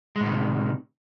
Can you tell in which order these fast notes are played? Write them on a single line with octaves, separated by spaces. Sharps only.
G#3 A2 D#3 C3